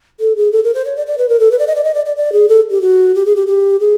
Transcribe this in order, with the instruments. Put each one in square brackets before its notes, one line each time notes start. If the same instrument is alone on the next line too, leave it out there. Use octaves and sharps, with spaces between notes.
[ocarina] A4
G#4
A4
A#4
C5
C#5
D5
D5
B4
A#4
A4
B4
D5
D#5
D5
D#5
D5
D5
D5
G#4
A4
G4
F#4
G4
G#4
G4
G4
G#4